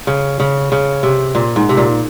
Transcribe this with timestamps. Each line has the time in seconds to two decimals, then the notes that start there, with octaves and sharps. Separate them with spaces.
0.07 C#3
0.40 C#3
0.72 C#3
1.03 C3
1.35 A#2
1.56 G#2
1.69 C3
1.77 A#2